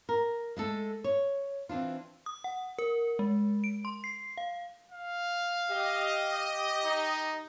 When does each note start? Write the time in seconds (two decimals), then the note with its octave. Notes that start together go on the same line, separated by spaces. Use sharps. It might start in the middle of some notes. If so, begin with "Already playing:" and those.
0.09 A#4
0.57 G#3 A3 A4
1.04 C#5
1.69 E3 C4 D4 F4
2.26 D#6
2.44 F#5
2.79 A#4
3.19 G#3
3.64 D7
3.85 C6
4.04 C7
4.38 F5
4.92 F5
5.71 G4 D#5
6.84 D#4